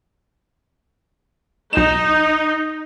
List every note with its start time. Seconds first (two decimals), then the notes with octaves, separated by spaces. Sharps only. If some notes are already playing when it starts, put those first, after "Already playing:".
1.73 B1 D#4 E7